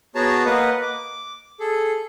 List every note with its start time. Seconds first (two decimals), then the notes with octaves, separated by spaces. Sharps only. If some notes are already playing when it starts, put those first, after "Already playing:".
0.15 B3 F#4 G#4 C#5 A5 A#5
0.45 A#3 B4 D#5 F#5
0.82 D6
1.60 G#4 A4